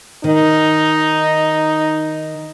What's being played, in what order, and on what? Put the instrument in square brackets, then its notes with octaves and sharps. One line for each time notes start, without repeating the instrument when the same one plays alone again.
[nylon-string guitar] D#3 [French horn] D#4